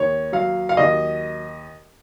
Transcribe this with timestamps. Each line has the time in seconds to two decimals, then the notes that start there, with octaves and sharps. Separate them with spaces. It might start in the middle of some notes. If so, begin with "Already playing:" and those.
Already playing: D#2 C#5
0.33 F#3 F5
0.69 F5
0.77 D#2 D#5